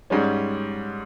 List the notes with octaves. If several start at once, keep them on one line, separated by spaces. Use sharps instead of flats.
G#2 G3 C#4